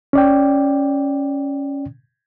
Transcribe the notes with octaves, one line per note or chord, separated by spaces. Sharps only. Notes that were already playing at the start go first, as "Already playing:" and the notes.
C#4 D5 G5